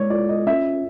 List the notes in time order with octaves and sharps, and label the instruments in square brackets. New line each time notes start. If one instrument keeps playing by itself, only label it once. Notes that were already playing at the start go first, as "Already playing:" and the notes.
Already playing: [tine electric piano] G#3 [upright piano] C#5 D5
[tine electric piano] F4 [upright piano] D5
[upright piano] D#5
[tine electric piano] C#4 [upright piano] E5